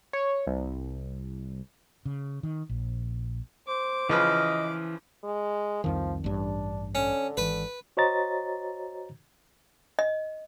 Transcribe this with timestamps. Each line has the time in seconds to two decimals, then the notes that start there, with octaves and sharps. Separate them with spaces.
0.13 C#5
0.47 C2
2.05 C#3
2.43 D#3
2.69 A#1
3.68 C5 D6
4.09 C#3 E3 F3 B4 D#5 F6
5.24 G#3
5.84 C2 F2 D#3 F3
6.24 A1 G2 D4
6.95 D3 C#4
7.37 G#1 E3 B4
7.97 F#4 C5 C#5 D#5 A#5 A6
9.99 D#5